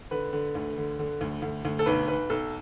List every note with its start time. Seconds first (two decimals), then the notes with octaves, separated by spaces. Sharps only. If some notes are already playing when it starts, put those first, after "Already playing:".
0.11 D3 B4
0.33 D3
0.55 D2
0.78 D3
0.99 D3
1.21 D2
1.42 D2
1.65 D2
1.79 A4
1.86 B1 B4
2.08 B1 B4
2.30 B1 A4